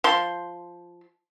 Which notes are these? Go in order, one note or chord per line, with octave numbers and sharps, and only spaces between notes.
F3 C6